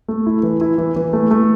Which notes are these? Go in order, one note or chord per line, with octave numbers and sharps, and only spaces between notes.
A3
E4
E3
E4
E3
E3
A3
A3